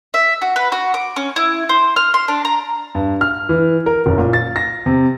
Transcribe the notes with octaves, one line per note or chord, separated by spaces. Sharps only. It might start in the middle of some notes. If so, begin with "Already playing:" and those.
E5
F#4
B4
F#4
D6
C#4
E4
C5
F6
C6
D4
A#5
G2
F6
E3
A#4
F#1
A#2
A6
A#6
C3